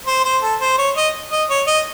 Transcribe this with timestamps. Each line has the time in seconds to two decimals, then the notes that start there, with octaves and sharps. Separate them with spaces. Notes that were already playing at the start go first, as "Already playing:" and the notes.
0.07 C5
0.25 C5
0.42 A4
0.61 C5
0.78 C#5
0.96 D#5
1.31 D#5
1.49 C#5
1.67 D#5